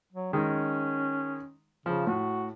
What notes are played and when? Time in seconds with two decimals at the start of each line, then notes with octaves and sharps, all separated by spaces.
0.12 F#3
0.33 D#3 G#3 C#4 D#4
1.86 C#3 F3
2.07 A2 F#4